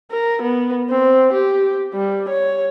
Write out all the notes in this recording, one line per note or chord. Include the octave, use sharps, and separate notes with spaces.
A#4
B3
C4
G4
G3
C#5